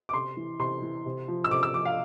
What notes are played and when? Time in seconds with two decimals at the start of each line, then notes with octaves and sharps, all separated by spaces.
0.09 D6
0.13 C3 C6
0.37 E3
0.59 C3 C6
0.82 E3
1.06 C3
1.28 F3
1.44 E6
1.51 C3 D6
1.63 E6
1.74 F3 D6
1.85 F5